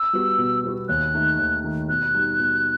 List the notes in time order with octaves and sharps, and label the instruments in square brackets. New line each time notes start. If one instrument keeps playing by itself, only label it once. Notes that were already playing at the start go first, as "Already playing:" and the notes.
Already playing: [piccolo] E6
[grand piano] G3 B3 F#4
B2
G3 B3 F#4
[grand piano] D#2 [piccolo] F#6
[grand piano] D#3 A3 D#4
D#2
D#3 A3 D#4
[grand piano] B2 [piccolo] F#6
[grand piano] G3 D#4
B2